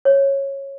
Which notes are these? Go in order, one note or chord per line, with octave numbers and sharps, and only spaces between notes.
C#5